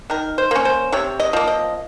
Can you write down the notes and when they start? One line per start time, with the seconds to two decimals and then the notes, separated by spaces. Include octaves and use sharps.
0.10 D#3 A#4
0.38 C5
0.51 A#3 C#4
0.65 C5
0.92 C3 C#5
1.20 D#5
1.33 F3 A#3
1.47 D#5